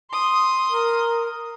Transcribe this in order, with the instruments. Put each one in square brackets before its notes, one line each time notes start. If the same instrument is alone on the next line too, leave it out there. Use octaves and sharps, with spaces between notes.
[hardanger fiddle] C6 D#6
[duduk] A#4